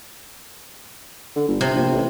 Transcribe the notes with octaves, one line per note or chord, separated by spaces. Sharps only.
D3
G1
C3
A#1
A1